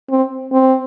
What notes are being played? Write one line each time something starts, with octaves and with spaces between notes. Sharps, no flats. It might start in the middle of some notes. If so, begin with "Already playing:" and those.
C4
C4